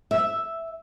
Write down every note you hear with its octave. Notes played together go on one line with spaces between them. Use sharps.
E5